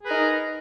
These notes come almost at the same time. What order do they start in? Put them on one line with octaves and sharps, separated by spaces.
G#4 B4 A#4 D#4